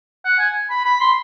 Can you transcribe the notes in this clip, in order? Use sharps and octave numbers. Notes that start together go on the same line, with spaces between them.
F#5
G#5
B5
B5
C6